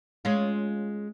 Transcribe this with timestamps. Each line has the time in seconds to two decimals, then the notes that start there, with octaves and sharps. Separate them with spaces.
0.25 G#3 C#4 F4